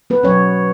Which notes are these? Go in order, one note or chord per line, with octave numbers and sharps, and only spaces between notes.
B3 B4
B2 F#3 C#4 C#5